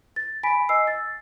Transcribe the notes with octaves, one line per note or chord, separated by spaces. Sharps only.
A6
G#5 B5 B6 D7
D#5 G#5 E6 C7
A6